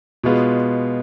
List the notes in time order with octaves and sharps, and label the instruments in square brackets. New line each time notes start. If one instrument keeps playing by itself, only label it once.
[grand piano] B2 G#3 B3 F4